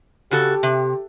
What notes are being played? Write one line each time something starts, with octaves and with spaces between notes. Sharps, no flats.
C#3 F#4 G4 A4
C3